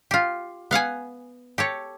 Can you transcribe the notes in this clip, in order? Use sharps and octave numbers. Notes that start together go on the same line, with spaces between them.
F4 G4
B3 F5 F#5 G#5
G4 A4 C#5